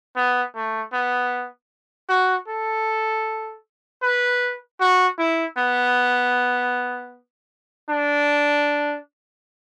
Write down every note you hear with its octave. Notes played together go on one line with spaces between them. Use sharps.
B3
A3
B3
F#4
A4
B4
F#4
E4
B3
D4